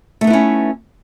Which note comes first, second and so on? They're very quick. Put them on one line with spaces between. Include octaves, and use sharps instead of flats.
A3 D#4 B3 E4 C#4